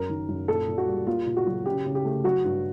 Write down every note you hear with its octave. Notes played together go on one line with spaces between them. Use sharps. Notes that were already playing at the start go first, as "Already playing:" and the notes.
Already playing: F#2 A#4
D#3
F#2
A#2 A4
A#2
F#4
G3
A#3 F4
A#2
F#4
F#3
C#3 G4
C#3
G4
A3
F#3 F#4
G2